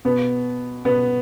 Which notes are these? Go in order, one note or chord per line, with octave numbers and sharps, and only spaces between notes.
B2 B3
B2 B3